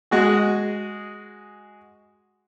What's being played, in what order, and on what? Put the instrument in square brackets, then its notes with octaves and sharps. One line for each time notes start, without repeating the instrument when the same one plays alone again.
[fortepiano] G#3 F#4 G#4